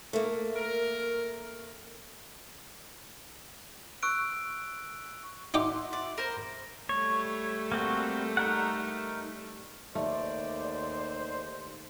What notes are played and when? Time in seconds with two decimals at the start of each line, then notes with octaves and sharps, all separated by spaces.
0.13 A3 A#3
0.56 A#4
4.03 C#6 E6 F#6 D7
5.54 D#4 F#4 E5 G5 C6 D6
5.93 D5
6.18 A#4 C5
6.89 G3 A3 A4 C#5
7.72 A#3 C4 F#4
8.37 D#4 A#4 F#5
9.95 D#2 A3 C5 D5